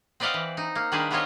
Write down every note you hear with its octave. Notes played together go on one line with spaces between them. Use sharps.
C4 B4 D5 D#5 F5 F#5
E3
D#4
A#3
D#3 G3 D4 G#4 B4 C5
G3 B3 C4 F4 C#5 D#5